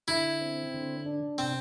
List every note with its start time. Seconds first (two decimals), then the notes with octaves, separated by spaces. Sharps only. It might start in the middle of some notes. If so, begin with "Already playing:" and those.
0.08 D3 E4
0.41 C4
0.74 D3
1.06 D4
1.38 C3 C4